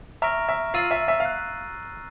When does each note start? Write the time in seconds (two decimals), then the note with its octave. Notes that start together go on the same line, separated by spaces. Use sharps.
0.22 E5 A#5 C#6 F6 A#6 D7
0.49 E5
0.74 F4 F5 E6 A6 C7 D#7 F#7
0.91 E5
1.08 E5
1.20 F5
1.25 F#6